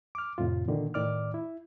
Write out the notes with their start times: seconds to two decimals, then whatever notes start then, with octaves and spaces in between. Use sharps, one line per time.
0.15 D6 F6
0.38 F2 A2 C3 F4
0.68 A#2 D3 D#3
0.94 A2 D#3 D5 D6 F6
1.34 E4